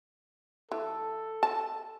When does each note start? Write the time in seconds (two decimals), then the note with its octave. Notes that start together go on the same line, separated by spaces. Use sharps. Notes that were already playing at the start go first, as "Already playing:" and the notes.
0.72 E3 A4
1.43 A5